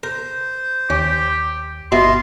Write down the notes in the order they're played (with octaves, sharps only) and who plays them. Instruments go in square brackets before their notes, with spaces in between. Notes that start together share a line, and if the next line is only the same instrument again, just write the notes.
[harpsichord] A#4 [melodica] C5
[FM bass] D#2 [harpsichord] C#4 [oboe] G4
[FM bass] G1 [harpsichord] B2 E4 [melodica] F4 D#5 F5 [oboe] C6